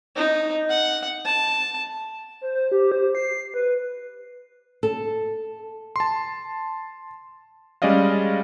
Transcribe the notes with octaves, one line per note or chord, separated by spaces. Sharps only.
D#4
F#5
A5
C5
C5
G4
C5
C7
B4
A4
A5 C6
G3 G#3 C#4 D5 D#5 F5